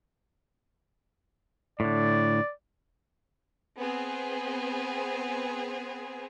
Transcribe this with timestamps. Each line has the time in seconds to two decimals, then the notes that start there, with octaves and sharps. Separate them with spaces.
1.80 A2 D3 D5
3.78 B3 C4 G#4